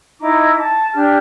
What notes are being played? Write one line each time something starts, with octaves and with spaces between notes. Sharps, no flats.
D#4 E4 A#5 D6
A5
D4 G4 F6